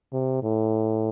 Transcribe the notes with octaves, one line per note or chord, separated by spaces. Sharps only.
C3
A2